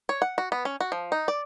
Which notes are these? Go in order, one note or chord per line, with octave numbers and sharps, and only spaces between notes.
C#5
F#5
F#4
B3
C#4
F#4
F3
D#4
D5